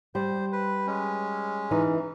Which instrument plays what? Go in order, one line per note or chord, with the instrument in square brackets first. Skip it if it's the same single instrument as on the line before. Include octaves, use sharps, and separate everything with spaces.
[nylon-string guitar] G3 [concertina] C5
[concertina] B4
G#3 C#4
[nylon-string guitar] E3 D#4